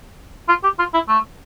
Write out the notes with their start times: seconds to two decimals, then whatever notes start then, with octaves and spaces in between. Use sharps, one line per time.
0.49 F4
0.64 G4
0.79 F4
0.94 E4
1.09 A3